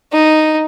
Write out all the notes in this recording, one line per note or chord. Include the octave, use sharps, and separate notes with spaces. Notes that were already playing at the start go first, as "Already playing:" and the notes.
D#4